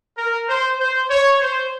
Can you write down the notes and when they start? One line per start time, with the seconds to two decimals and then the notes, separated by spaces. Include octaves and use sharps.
0.18 A#4
0.49 C5
0.80 C5
1.10 C#5
1.41 C5